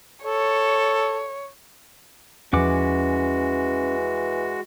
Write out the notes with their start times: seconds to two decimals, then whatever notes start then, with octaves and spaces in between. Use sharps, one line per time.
0.24 A4 C#5
2.53 E2 E3 F3 G#3 C#4 F#4 F#5 D6